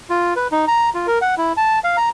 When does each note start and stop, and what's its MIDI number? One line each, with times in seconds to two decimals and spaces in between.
0.10 0.34 65
0.36 0.48 71
0.52 0.65 63
0.68 0.90 82
0.94 1.07 65
1.07 1.19 70
1.22 1.35 78
1.38 1.53 64
1.57 1.79 81
1.84 1.97 77
1.97 2.09 82